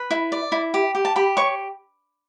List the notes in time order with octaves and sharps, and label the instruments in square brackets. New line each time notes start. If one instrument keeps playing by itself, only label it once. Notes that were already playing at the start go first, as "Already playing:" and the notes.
Already playing: [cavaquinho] B4
E4
D5
E4
G4
G4
A5
G4 B5
C#5 C#6